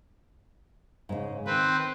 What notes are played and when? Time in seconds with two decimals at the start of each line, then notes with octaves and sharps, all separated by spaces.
1.09 G#2 C#3
1.46 D#3 C4 B4